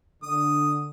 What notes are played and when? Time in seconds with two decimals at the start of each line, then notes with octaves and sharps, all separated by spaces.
0.23 D3 D#6